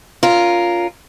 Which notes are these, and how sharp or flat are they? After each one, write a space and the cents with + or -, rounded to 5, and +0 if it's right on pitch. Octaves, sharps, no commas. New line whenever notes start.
C#4 +30 F4 +0 A#4 +0